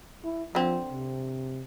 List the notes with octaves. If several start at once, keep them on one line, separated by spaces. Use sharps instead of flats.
E4
D3 F3 C4
C3